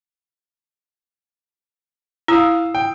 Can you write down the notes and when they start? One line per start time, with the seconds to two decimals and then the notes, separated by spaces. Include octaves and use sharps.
2.28 E4 F5 D#6 E6
2.75 G5